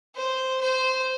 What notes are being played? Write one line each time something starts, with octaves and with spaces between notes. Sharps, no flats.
C5
C5